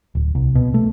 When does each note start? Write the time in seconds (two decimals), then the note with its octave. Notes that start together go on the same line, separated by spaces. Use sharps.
0.15 D1
0.35 C2
0.55 B2
0.74 A3